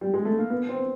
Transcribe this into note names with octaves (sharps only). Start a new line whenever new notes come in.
G3
G#3
A3
A#3
B3
C4